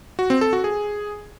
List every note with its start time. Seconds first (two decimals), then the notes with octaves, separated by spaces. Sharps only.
0.19 F#4
0.30 C4
0.41 A4
0.53 F#4
0.64 G#4